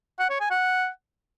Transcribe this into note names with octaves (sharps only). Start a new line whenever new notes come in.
F#5
C#5
G#5
F#5